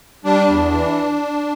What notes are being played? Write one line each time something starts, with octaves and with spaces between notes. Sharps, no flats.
G3 D4
E2
E3